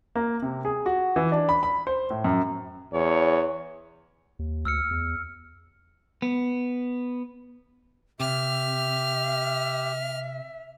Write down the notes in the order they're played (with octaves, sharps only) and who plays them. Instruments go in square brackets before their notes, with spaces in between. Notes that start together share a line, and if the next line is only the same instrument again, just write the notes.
[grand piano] A#3
C3
G#4
F#4
E3
D4
B5
B5
C5
A2
F#2
[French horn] E2 [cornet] C#5
[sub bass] D#2
[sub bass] D2 [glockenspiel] E6 F6 C#7
[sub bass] E2
[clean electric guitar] B3
[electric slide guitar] C3 [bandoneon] G4 [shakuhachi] E5 [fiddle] F6